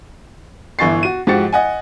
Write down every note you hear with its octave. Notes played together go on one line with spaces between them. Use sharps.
G1 E3 G#5 C#6 A6 C7
F#4 D#7
G#2 F3 F#4 G4 A6 C#7
D#5 F#5 G#5